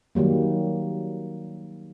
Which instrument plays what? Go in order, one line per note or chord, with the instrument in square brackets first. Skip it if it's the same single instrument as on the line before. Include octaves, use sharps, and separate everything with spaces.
[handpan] D#3 F#3 G3 A#3